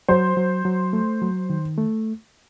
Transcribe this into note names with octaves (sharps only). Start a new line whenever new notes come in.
F#3 C5
F#3
F#3
A3
F#3
D#3
A3